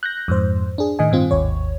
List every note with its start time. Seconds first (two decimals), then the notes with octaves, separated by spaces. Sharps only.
0.03 F#6 G6 A#6
0.28 F2 G#2 C5
0.78 D4 G#4
0.99 A2 D#3 D#5 G#5
1.11 G2 D#3 C4 F4
1.31 G#1 D#2 C#5